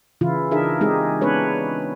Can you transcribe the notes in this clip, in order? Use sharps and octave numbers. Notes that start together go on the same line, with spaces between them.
C#3 E3 E4 F4
D4 D#4 G#4 A#4 E5
G#3 C4 D#4 G4 G#4
B3 C#4 D4 B4 C#5